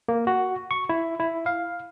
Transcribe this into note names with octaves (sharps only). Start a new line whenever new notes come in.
A#3
F#4
C#6
E4
E4
F5